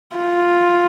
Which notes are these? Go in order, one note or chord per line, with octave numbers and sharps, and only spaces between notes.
F4